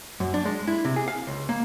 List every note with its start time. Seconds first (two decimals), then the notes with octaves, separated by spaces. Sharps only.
0.20 F#2
0.34 D4
0.45 G#3
0.68 E4
0.85 C3
0.96 G#4
1.08 F5
1.27 C#2
1.49 A#3